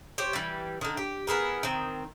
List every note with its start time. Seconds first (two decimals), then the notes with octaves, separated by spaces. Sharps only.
0.18 G4 C5 C#5
0.33 E3 G3
0.81 D3 D#3
0.97 G4
1.27 B3 E4 G#4 A#4
1.63 D#3 C4